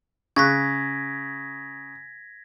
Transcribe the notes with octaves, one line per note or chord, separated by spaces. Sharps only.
C#3 C#6 F#6 G#6 A#6 B6